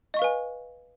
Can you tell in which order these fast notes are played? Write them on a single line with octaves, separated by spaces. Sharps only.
D#5 C#6 F5 B4 G#5